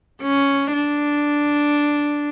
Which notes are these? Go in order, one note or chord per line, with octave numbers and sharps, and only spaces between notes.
C#4
D4